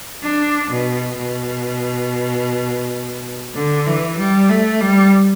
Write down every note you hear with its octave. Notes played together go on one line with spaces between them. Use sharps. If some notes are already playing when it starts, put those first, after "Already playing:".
D4
B2
B2
D3
E3
G3
A3
G3